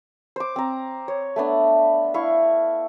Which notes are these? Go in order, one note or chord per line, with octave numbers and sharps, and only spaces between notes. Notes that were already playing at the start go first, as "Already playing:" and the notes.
C5 D6
C4 A#5
C#5
A3 B3 D4
E4 F5 C#6